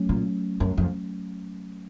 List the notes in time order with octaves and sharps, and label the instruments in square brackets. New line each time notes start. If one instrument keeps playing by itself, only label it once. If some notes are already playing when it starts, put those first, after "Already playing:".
Already playing: [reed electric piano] F#3 A3 C#4
[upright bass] A#2
F#2
F2